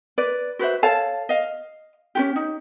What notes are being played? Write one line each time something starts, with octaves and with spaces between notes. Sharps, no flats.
B4 D5
F#4 B4 C5 E5
A4 C#5 F5 A5
D#5 F5
C#4 F#4 G4
D#4